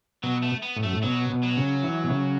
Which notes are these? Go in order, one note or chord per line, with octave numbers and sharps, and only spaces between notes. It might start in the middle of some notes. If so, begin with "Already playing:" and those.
B2 F#3
A3
B3
A2
F#2 A3
A2
B2 F#3
B2
F#3
C#3
E3
B2
C#3